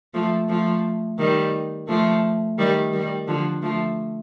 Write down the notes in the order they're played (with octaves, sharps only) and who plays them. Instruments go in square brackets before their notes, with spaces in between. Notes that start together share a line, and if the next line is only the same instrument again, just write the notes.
[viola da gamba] F3 A3
F3 A3
D#3 G3
F3 A3
D#3 G3
D#3 G3
D3 F3
F3 A3